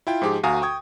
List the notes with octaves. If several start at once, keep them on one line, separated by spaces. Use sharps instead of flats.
E4 F4 G5
G#2 F3 G4 G#4 D6
D2 F#4 F5 G#5 A#5 D#6
G5 C#6 D#6 G#6